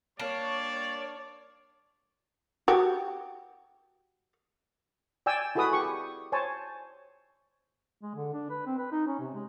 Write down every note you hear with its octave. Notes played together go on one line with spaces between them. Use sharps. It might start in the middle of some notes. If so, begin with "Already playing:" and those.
G3 A#3 D4 C#5 D5
F#4 G4
D5 G5 G#5 E6
E4 F#4 G#4 A4 B4 D#6
G4 C#6
C5 C#5 G#5 A5
G#3
D3
D4
B4
C4
B4
D#4
C#4
C3
G#3